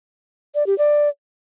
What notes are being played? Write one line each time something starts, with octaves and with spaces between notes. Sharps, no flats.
D5
G4
D5